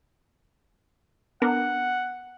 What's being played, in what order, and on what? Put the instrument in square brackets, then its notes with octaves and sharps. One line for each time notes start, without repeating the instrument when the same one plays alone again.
[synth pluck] B3 D4 A#4 [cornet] F#5